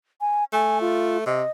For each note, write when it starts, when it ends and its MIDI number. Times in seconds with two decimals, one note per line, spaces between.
0.21 0.44 80
0.53 1.23 57
0.53 0.78 80
0.81 1.18 65
1.26 1.42 48
1.26 1.51 75